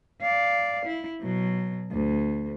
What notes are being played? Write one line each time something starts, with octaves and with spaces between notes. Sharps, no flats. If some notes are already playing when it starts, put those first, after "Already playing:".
D5 F5
E4
B2 F#3
D2